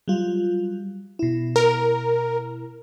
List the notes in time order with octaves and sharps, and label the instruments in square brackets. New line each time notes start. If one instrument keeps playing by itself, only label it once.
[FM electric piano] F#3 G3 F4
B2 E4
[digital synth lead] A#4